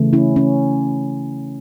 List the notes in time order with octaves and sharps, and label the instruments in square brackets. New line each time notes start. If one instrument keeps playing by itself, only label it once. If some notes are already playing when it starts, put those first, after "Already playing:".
Already playing: [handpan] C#3 E3 A3
C#4 E4
C#4